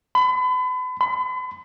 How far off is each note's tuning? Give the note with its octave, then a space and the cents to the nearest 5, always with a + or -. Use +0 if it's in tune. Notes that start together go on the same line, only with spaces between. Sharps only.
B5 +35
B5 +40